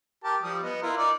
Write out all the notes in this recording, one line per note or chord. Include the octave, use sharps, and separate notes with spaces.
G4 A#4 A5
F3 G3 D#6
B3 D#5
E4 F4 A#4
D#4 A#4 D5